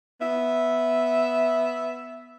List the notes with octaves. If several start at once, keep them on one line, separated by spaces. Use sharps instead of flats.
B3 E5